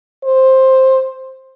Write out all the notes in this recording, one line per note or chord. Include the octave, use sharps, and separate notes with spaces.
C5